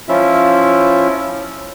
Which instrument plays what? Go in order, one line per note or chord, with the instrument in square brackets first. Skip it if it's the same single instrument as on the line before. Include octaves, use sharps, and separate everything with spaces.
[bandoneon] F3 C#4 E4 F4 E5